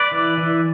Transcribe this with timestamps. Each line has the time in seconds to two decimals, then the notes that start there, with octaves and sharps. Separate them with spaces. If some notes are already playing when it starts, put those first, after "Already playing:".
Already playing: B4 D5
0.12 E3
0.38 E3